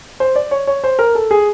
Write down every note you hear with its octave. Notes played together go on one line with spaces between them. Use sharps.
C5
D5
C#5
C#5
C5
A#4
A4
G#4